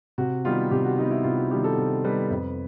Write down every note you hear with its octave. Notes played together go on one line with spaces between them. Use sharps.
C3 F#4
D#3 G3 B3 F4
C3 G4
F#4
D#3 G3 B3 D#4
E4
C3 F4
F#4
D#3 G3 B3 G4
A4
C3
D#3 G3 B3 B4
F2